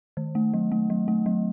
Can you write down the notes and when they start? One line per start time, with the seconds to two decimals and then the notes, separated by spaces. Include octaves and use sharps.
0.17 D#3
0.35 A3
0.54 F#3
0.72 A3
0.90 F#3
1.08 A3
1.26 F#3